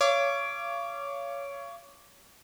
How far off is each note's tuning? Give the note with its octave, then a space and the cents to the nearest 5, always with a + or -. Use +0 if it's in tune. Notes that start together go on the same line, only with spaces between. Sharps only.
C#5 +20 F5 -30 D6 +0